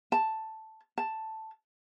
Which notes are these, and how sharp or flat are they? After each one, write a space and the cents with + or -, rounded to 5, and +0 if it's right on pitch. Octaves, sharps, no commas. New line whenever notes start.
A5 +0
A5 +5